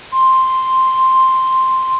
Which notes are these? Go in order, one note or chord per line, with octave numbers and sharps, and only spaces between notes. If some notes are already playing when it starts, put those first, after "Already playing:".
C6